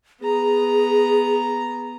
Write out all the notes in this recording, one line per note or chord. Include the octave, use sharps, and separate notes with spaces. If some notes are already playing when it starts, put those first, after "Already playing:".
B3 G#4 A#5